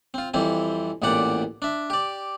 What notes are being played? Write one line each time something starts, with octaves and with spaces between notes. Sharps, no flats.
C4 F4
F2 E3 G3 C4 E4
A1 E2 A#2 G4 D5 F#5
D4 E5
G4 D5